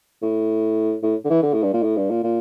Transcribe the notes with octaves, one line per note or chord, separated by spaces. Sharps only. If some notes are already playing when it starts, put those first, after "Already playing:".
A2
A2
D3
E3
D3
A2
G2
A#2
A2
G2
A#2
A#2